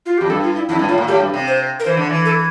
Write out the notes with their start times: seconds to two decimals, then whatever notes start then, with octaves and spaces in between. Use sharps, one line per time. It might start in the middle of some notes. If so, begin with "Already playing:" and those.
0.06 F4
0.18 F2 G4
0.30 G2 A4
0.43 F4
0.55 E4
0.69 F2 E4
0.79 G2
0.88 A2 F4
0.98 A#2
1.08 A2 G4
1.20 G2
1.34 C3
1.47 C5
1.80 A#4
1.85 E3 C5
1.97 D3
2.09 E3
2.25 A4